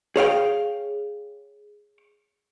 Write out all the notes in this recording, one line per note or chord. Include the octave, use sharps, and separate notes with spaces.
G#4 C#5 F5 G5